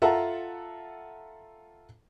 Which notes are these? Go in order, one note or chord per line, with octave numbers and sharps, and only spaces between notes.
F4 A4 E5 F#5 A5 A#5